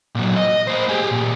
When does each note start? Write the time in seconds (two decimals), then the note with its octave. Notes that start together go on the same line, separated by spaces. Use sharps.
0.15 A#2 F#3
0.36 D#5
0.68 A#3 C5
0.90 G4 G#4
1.12 A#2 G3